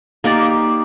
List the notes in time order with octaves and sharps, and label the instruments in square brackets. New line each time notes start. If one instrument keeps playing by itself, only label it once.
[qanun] A#3 D#4 G4 D5